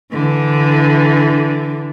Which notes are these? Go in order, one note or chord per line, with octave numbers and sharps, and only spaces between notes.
D3 E3